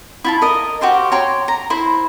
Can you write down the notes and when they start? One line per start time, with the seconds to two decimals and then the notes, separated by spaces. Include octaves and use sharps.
0.24 E4 F4 A5
0.41 A#4 D#5
0.81 F#4 G4 C5 F5
1.12 C#5 G5 A#5 C6
1.48 A#5
1.70 E4 C5